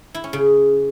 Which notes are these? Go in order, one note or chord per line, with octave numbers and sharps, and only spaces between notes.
E4
C#4
C#3